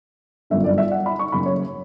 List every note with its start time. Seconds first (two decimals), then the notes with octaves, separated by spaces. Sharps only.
0.50 G1 F#2 D3 E5
0.64 D5
0.78 E5
0.92 F#5
1.06 B5
1.19 C#6
1.32 F#1 F#2 C#3 B5
1.46 C#5